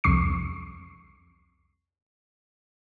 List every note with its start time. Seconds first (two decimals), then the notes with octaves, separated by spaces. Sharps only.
0.04 C2 F2 C#6 C7